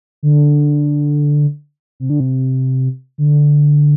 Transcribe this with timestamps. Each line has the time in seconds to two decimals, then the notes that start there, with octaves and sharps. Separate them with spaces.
0.23 D3
2.00 C3
2.10 D3
2.20 C3
3.18 D3